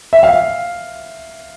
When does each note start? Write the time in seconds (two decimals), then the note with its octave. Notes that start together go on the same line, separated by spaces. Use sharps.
0.13 E5
0.23 F5